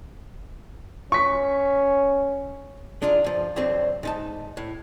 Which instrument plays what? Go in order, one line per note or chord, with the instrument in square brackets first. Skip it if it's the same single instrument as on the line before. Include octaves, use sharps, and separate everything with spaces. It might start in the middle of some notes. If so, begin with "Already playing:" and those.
[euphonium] C#4 [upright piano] C#6 B6
[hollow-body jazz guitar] G#3 D4 D#4 F4
G2 F3
C2 F2 D3 F#3 C4 C5
G#2 D#4 A5
A2